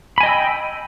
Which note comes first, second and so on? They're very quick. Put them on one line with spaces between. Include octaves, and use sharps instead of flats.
B5 G#5 D#5 G5 E6